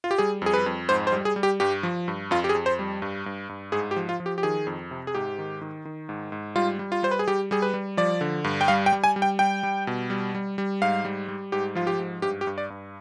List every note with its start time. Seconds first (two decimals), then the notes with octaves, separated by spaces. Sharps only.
0.04 F4
0.11 G4
0.18 G3 G#4
0.42 F2 G#4
0.54 B4
0.66 F2
0.89 G#2 C5
1.07 C5
1.12 G3
1.25 G#4
1.36 G3
1.43 G4
1.60 G2 G4
1.83 F3
2.08 G2
2.31 F2 F4
2.44 G4
2.49 G#4
2.55 F2
2.66 C5
2.79 G3
3.02 G2
3.26 G2
3.49 G2
3.72 G#2 G#4
3.91 G4
3.96 F3
4.09 F4
4.20 F3
4.26 G4
4.38 G4
4.43 D#3 G#4
4.67 F2
4.91 C3
5.07 G#4
5.15 G#2 G4
5.38 D#3
5.61 D#3
5.85 D#3
6.09 G#2
6.32 G#2
6.56 G3 F4
6.79 G3
6.92 F4
7.03 G3 C5
7.11 B4
7.19 G#4
7.28 G3 G4
7.51 G3 G#4
7.62 B4
7.74 G3
7.97 F3 D5
8.21 D3
8.44 G2
8.61 G5
8.68 G3 F5
8.86 G5
8.92 G3
9.04 G#5
9.16 G3
9.22 G5
9.39 G3 G5
9.63 G3
9.87 B2
10.10 G3
10.35 G3
10.58 G3
10.82 G#2 F5
11.05 G3
11.28 G3
11.52 G#2 G4
11.75 F3 F4
11.87 G4
11.99 G#2
12.22 G2 G4
12.41 G4
12.47 G2
12.58 D5
12.70 G2